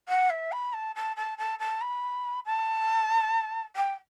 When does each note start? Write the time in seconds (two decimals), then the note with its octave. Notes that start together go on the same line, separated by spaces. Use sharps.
0.09 F#5
0.30 E5
0.52 B5
0.73 A5
0.95 A5
1.16 A5
1.38 A5
1.59 A5
1.81 B5
2.46 A5
3.76 G5